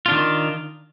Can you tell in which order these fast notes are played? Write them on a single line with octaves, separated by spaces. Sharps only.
F4 D4 D#3